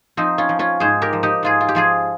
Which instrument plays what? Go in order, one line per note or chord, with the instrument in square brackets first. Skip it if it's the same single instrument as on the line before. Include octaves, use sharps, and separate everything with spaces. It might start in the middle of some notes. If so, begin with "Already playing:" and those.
[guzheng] F3 C4 D#4
C#4 F4
F3
C#4 F4
G#2 G#4 C5
G4 A#4
F3
D#4 G4
G#2 F4 G#4
F4
G4
F3 F4 G#4